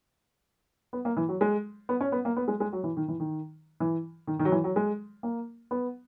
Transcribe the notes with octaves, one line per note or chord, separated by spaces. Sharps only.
B3
A#3
E3
F#3
G#3
B3
C#4
B3
A#3
B3
G#3
G#3
F#3
E3
D#3
E3
D#3
E3
D#3
D#3
F#3
E3
F#3
G#3
A#3
B3